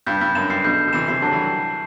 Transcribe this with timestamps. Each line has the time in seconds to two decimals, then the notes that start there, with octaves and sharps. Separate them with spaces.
0.07 G2 G6
0.21 G2 G6
0.35 F#2 E7
0.50 G2 C7
0.64 B2 D3 G6
0.79 G6
0.87 D3
0.93 C3 E3 E7
1.08 C3 E3 C7
1.22 D3 F#3 A5
1.31 E3 G3